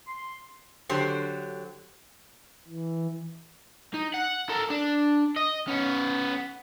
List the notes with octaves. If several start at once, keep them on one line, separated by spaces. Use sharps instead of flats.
C6
D3 F#3 G4 C5
E3
D#4
F#5
A4 A#4
D4
D#5
B3 C#4